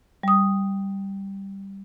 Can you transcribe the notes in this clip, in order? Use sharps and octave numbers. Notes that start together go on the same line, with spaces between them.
G3 D#6